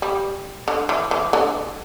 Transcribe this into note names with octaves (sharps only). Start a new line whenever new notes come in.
G3
D3
E3
E3
D3